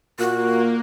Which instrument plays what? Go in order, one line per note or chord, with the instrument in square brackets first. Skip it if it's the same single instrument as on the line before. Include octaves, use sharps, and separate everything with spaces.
[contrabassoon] A#2 [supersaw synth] A#3 [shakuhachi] F#4 [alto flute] A#4